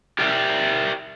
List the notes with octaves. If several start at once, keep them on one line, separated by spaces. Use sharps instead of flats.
G4 A#4 D5 E5 G5